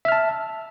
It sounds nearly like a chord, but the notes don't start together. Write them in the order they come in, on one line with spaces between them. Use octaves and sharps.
E5 F6 A5